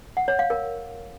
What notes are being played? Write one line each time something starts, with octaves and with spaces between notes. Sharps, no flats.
F#5
C#5
F5
A#4